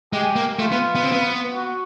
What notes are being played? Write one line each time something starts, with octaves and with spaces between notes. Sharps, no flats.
G#3 G4
A#3
A3 F4
B3
B3
C4
B3
F#4